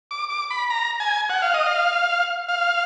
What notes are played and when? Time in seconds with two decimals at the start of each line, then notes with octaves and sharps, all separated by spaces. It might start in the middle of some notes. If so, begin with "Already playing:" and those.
0.11 D6
0.30 D6
0.51 B5
0.70 A#5
1.00 G#5
1.30 F#5
1.42 F5
1.54 D#5
1.66 F5
2.48 F5